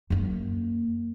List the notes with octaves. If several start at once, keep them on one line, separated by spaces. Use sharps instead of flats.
F#2 A#3